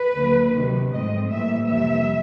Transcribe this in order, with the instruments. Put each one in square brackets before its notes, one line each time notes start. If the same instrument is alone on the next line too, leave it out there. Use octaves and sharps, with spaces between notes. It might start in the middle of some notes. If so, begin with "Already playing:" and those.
Already playing: [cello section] B4
D2 D3 F#3 A#3
C3 D#3 F#3
G#2 F3 A3 C4 D#5
A2 E3 G3 A#3 E5
F2 C3 E3 G3 A#3 E5